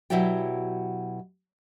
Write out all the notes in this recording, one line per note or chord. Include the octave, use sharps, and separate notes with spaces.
B2 F#3 E4 G4 D5 G5